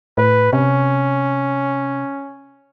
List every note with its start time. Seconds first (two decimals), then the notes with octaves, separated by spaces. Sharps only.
0.18 A2 B4
0.53 C3 C#4